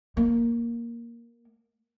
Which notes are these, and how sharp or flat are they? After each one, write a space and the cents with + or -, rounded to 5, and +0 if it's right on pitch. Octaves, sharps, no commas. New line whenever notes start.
A#3 +5